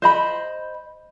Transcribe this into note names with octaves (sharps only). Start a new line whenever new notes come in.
C5 D#5 B5